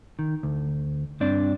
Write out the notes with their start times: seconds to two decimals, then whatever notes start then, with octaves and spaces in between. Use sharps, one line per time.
0.19 D#3
0.43 D2
1.20 G2 C4 D4 D5